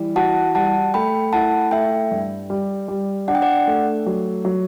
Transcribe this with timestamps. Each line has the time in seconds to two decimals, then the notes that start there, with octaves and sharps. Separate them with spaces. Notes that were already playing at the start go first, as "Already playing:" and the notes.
Already playing: E3 G3
0.16 F#4 F#5 A5
0.55 G3 F#5 A5
0.94 A3 G5 B5
1.33 E4 F#5 A5
1.71 A3 E5 G5
2.11 G2
2.50 G3
2.88 G3
3.28 D4 F#5
3.35 G5
3.42 D5 F#5
3.67 A3
4.06 F#3
4.45 F#3